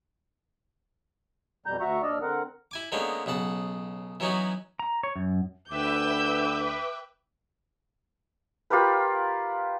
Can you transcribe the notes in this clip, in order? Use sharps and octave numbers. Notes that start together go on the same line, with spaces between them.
F2 B2 G3 A#5 G6
D2 F#4 E5 A#5 C#6
D#2 D4 D5 D#5 E6 F6
D3 C4 A#4 F#5
E4 G#5 D6
D3 G#3 A#3 B3 C#4 D#4
B1 C#3 F#5 A5
E3 F#3 B3 C#4 D#4 F#4
A#5
C#5
F#2
D2 B4 E5 G5 D6 E6 G6
F4 G4 A#4 B4